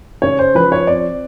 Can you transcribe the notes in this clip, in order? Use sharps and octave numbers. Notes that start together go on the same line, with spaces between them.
C#3 C#5
C5
F3 B4
C#5
C4 D5